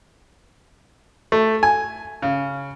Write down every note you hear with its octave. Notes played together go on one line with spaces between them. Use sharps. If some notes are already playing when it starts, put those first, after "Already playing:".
A3
G#5
C#3